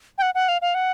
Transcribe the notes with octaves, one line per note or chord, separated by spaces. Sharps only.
G5
F#5
F#5
F5
F5
F#5